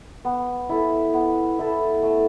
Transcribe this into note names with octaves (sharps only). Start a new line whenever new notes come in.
B3
E4 A4
B3
E4 A4
A3